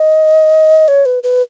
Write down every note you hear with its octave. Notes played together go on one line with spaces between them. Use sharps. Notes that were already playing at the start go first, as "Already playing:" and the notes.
Already playing: D#5
C#5
B4
B4